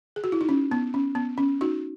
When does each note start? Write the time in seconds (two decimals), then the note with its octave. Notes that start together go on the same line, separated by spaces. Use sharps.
0.16 G#4
0.24 F#4
0.32 E4
0.41 D#4
0.49 C#4
0.71 B3
0.94 C#4
1.15 B3
1.38 C#4
1.61 D#4 F#4